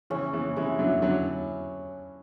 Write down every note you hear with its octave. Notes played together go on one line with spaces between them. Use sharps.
C#3 E3 C#4
C#3 E3
E3 G#3 E4 B4
D3 F#3
D3 F#3 C#4